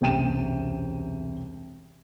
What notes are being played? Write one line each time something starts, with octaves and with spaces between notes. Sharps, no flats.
E1 C2 F#2 G5 D#7 E7